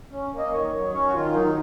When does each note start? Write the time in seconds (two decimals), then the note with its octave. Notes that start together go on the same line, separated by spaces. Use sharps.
0.11 C#4
0.32 A#3
0.38 D#5
0.52 D#3 C#5
0.73 F#3
0.93 C#4 C#5
1.08 F#4
1.13 D#3 F4
1.33 F#3 D#4